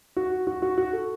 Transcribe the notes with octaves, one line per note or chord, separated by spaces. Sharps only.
F#4
F#4
F#4
F#4
A4